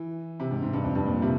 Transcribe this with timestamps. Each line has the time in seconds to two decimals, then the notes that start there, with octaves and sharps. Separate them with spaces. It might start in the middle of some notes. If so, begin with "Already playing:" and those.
Already playing: E3
0.40 C3
0.51 G#2
0.62 G#2
0.73 G2
0.84 F2
0.95 G2
1.06 A#2
1.22 C3